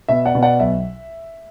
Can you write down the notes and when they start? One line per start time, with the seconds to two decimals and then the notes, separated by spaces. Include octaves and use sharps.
0.08 B2 E5
0.25 D5 F#5
0.35 B2
0.43 D5 F#5
0.60 B1 E5